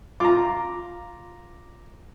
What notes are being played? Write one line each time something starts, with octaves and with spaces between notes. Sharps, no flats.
F4 A#5 D6